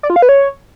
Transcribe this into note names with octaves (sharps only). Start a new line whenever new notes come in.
D5
F4
F5
B4
C#5